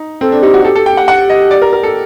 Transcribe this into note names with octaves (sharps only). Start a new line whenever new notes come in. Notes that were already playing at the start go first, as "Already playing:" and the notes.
Already playing: D#4
C4 A4
D4
D#4 G4
F#4
G4 A4
A4
G5
F#5
F#5
D#5
D5
A#4
A#4
A4